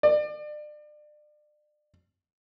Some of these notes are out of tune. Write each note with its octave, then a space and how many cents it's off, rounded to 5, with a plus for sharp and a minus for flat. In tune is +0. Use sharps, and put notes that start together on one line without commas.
D5 +35